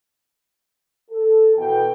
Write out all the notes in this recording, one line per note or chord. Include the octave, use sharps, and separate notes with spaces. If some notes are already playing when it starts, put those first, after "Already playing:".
A4
B2 E3 G5